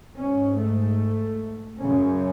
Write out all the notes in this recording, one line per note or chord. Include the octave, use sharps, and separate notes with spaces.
G#2 C#4
A3
F#2 C#3 C#4